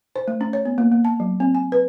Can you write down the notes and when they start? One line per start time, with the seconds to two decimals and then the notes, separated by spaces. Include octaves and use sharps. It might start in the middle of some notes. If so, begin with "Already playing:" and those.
0.16 C5
0.28 A3
0.41 C#4
0.53 C#5
0.65 B3
0.78 A#3
0.92 A#3
1.05 A5
1.20 F#3
1.40 C4
1.55 G#5
1.72 B4